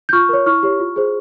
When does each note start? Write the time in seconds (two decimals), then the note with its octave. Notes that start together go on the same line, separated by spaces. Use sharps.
0.09 G6
0.13 F4 C#6 F6
0.29 A#4 C#5
0.46 E4 C#6 F6
0.63 G4 C#5
0.80 F4
0.96 G#4 C5